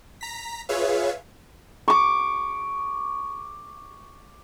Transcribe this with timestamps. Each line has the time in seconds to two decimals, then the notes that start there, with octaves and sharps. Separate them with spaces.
0.21 A#5 B6
0.69 F4 G#4 B4 C#5 E5 F5
1.88 C#6 D6